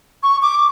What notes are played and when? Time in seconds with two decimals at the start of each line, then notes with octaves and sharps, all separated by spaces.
0.23 C#6
0.43 D6